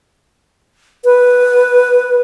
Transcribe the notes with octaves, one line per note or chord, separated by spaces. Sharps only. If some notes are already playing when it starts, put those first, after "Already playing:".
B4